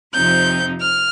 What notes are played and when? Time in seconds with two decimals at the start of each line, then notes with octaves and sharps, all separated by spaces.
0.14 F2 C3 F3 C4 D#4 G6
0.81 F6